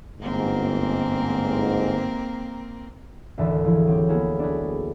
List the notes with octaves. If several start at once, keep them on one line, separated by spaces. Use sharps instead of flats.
G1 G#2 A#3 C4 A#4
G#1 D2 E3 E5 A5
F3 E4 G#4
F#3 C4 G4
A#3 B3 E4 G#4
D4 F#4 G#4 B4